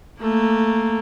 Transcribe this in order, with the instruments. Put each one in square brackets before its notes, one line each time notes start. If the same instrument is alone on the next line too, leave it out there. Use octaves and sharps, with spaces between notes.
[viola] A3 A#3